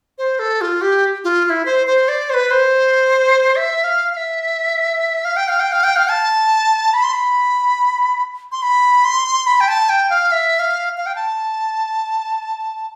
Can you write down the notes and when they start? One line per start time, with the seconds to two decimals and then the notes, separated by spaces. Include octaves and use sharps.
0.18 C5
0.39 A4
0.61 F4
0.81 G4
1.24 F4
1.45 F4
1.50 E4
1.65 C5
1.87 C5
2.08 D5
2.30 C5
2.34 B4
2.51 C5
3.56 E5
3.84 F5
4.12 F5
4.17 E5
5.25 F5
5.37 G5
5.49 F5
5.60 G5
5.72 F5
5.84 G5
5.96 F5
6.10 A5
6.94 B5
7.04 C6
7.13 B5
8.52 C6
8.62 B5
9.05 C6
9.47 B5
9.60 G5
9.68 A5
9.89 G5
10.10 F5
10.32 E5
10.59 F5
10.97 F5
11.06 G5
11.15 A5